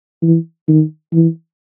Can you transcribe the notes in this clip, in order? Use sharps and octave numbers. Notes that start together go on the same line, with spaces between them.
E3
D#3
E3